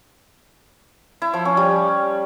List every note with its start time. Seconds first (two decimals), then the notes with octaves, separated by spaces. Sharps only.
1.22 E4
1.33 F3
1.45 C#4
1.57 G3